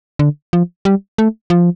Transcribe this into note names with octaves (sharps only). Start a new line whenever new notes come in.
D3
F3
G3
A3
F3